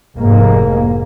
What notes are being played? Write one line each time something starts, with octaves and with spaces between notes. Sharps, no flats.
F1 G#2 A#3